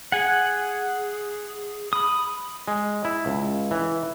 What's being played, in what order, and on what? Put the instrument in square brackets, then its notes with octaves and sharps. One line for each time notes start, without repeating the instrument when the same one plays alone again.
[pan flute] G#4 [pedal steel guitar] F#5 G#5
[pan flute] B5 [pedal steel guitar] D#6
[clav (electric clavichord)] G#3
E4
C#2
E3